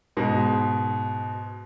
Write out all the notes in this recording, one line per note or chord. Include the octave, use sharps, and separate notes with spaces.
G#2 B2